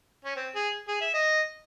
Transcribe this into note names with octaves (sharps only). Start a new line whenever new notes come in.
C#4
C4
G#4
G#4
E5
D#5